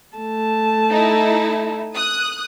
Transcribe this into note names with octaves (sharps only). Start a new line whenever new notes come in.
A3 A5
D#4 E4
D#6 F#6